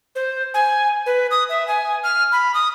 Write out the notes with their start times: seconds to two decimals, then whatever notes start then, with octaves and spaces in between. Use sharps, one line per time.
0.15 C5
0.54 G#5
1.06 B4
1.31 D#6
1.49 E5
1.68 G#5
2.04 F6
2.32 B5
2.54 D#6